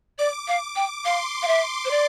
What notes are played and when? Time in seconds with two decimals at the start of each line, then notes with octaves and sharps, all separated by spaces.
0.19 D5 D6
0.48 F5
0.76 G5
1.05 F5 C6
1.43 F5
1.48 E5
1.85 C5
1.91 D5